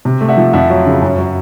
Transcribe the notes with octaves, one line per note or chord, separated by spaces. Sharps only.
C3
A3
E5 F#5
F3
F2 E5 F#5
F#3
C#3
F#2
F#3